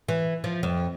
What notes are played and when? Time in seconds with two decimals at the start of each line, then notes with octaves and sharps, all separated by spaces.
0.09 E3
0.44 F3
0.63 F2